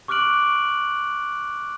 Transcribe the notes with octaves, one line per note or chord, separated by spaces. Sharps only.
C#6 D6 F6 F#6 D7 F#7